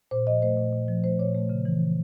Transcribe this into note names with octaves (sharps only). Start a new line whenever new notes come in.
A#2 C5
F3 D#5
A3 C5
A#2
A#2
F3
A3 C5
A#2 C#5
A3
C#3
E3